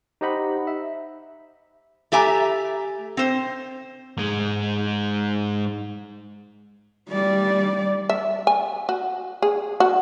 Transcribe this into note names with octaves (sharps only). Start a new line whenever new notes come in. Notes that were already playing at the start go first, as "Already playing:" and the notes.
D#4 G4 C5 D#5 F#5 B5
E5
A3 G4 E5 G#5 A#5
C4 C5
G#2 G#3
G3 D5
E5
G#5
F#4
G#4
F#4